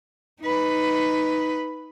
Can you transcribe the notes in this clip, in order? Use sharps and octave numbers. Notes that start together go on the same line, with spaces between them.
D#4 B4